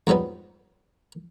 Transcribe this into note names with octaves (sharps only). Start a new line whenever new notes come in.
F2 G#2 F#3 G3 B3